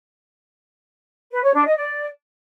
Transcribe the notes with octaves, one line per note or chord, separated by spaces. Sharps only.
B4
C#5
D4
D#5
D5